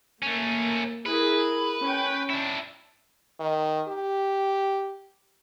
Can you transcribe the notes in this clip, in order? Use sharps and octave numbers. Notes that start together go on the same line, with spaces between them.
A3 A#3 C#4
E4 G#4 A#4 B4
C#4 G5
D4 E4
D#3
G4